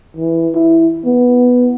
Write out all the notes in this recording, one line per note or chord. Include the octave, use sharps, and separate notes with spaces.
E3
E4
B3